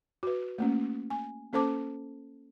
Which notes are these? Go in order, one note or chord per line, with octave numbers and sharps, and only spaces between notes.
F#4 B4
A3 A#3 C#4
G#5
A#3 C#4 A4 C5 A5 D6